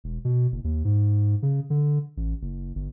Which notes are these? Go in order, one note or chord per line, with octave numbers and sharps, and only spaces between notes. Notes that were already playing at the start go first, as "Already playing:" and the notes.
E1
B2
F#1
D#2
G#2
C#3
D3
A1
F#1
G1